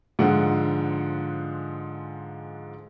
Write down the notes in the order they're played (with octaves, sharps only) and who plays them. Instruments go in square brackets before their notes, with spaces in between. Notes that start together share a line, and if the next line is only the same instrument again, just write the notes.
[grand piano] G#2 D3 F3 G#3 F#5